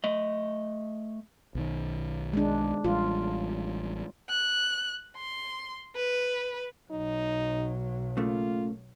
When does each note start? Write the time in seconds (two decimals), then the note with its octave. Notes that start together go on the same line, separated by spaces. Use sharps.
0.04 A3 D#5
1.55 B1 D#3
2.33 G#3 D4
2.84 A1 G3 F4
4.30 F#6
5.17 C6
5.96 B4
6.91 B1 F#3 D#4
8.17 C#3 A3 A#3 F4